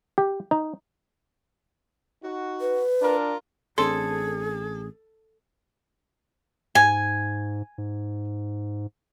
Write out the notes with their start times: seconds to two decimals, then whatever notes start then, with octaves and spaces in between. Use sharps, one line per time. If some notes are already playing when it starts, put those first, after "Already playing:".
0.18 G4
0.51 D#4
2.23 D#4 F#4
2.61 B4
3.02 D4 F4 A#4
3.78 A1 C4 D4 G#4 A4 C6
6.75 G#2 G#5
7.78 G#2